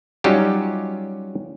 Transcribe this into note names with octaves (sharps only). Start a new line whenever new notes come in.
F#3 G3 C#4 D#4 F4 G4